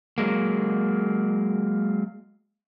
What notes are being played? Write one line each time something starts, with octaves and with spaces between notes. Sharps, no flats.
F#3 G#3 A#3